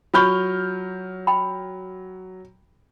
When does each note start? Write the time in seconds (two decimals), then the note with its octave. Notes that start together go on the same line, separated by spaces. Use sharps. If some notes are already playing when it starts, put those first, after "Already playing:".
0.14 F#3 F4 B5 C#6 F6 G6
1.27 G5 B5